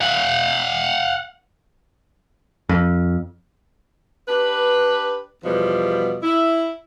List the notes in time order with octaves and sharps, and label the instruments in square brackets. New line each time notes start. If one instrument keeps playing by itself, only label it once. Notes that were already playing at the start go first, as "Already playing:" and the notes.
[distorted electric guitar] F5 F#5
[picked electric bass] F2
[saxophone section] D4 G4 B4
E2 B2 F3 G3 B3
E4